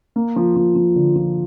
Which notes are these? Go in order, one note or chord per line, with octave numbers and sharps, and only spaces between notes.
A#3
F3
F3
F3
D3
F3